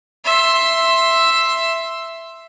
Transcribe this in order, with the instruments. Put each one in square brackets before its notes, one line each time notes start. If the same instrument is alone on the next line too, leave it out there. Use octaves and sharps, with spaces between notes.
[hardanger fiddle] E5 C6